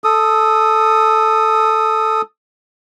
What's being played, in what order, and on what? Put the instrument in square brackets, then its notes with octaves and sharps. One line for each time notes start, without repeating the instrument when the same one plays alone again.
[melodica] A4 D#6